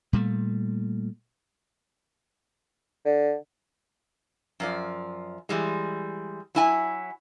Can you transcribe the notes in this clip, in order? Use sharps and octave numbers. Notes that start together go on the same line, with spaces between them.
A#2 G3 A3
D3
F#2 F3 D5
E3 G3 G#3
F#3 E4 G#5